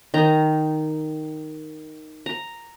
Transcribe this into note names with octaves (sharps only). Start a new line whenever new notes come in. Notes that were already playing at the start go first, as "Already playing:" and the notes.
D#3 D#4 A#5
A#5